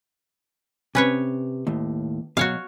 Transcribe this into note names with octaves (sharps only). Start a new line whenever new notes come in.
C3 C#4 B4 C#5
D#2 A2
B2 F#3 F#4 C#5 F5